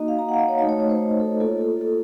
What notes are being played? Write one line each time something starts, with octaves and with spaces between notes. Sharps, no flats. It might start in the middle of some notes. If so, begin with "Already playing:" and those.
Already playing: A#3 D#4 F#4 D#5
F5
A#5
F#5
F5
D#5
C#5
A3 D#4 F#4 D#5
C#5
C#5
C5
A4
A#3 F4 A4
A4
A4